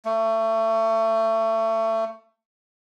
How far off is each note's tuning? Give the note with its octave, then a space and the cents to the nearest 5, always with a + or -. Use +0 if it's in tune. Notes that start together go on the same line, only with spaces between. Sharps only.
A3 +25